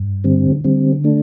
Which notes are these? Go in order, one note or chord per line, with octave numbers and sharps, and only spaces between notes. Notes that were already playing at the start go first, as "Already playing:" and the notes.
Already playing: G2
D3 G3 C4
D3 G3 C4
A3 D4